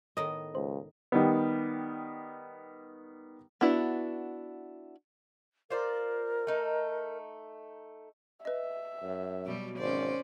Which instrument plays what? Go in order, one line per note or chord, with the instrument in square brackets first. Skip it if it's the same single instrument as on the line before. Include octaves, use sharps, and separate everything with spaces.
[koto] A2 D#3 B3 [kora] D#5
[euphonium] C#2 [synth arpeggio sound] C5
[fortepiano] D#3 G3 B3
[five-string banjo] B3 D4 E4 F#4
[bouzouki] F4 C5 D5 [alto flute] A#4
[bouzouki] A3 D#4
[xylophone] B4 D#5 [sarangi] E5
[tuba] F#2
[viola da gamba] B2 F#3 G3
[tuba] G#1 [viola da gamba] C#4 D5 [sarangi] C5